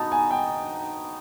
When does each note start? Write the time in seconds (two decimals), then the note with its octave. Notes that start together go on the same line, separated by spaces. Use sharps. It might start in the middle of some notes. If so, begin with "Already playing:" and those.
Already playing: B3 D#4 F#4 A5 A#5
0.12 G#5
0.31 G5